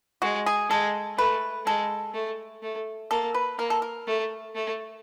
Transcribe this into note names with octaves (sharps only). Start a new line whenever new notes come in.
G#3 F#4
G#4
G#3 A4
A3 B4
G#3 A4
A3
A3
A#3 A4
B4
A#3 A#4
A4
A#4
A3
A3